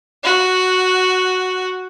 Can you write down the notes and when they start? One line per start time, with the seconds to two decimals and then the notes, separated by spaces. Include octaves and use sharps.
0.24 F#4